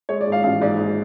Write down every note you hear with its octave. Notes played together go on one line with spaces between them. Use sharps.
G#3 C#5
D5
G#2
F5
A1 F5
G#2 D5
G#2